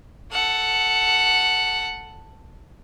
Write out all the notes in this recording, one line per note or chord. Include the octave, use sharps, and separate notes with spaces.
A4 F#5